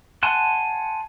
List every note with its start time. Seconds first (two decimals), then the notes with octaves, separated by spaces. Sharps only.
0.23 F#5 G#5 A5 C6 F#6